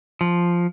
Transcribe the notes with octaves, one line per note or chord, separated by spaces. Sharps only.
F3